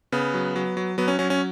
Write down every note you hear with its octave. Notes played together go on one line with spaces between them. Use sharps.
C#3 B3
F#3
F#3
F#3
F#3 B3
C#4
F#3 C#4
C#4